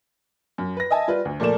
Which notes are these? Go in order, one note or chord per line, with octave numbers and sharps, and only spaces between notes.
F#2
B4 A#6
D#5 E5 G#5 A5
G3 F4 B4
D2
A#2 F3 A3 A#3 D5 E7